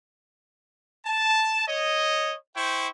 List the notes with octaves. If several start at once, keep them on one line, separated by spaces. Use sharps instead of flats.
A5
C#5 D#5
E4 C5 G5 C#6